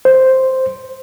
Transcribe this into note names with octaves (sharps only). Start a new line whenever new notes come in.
C5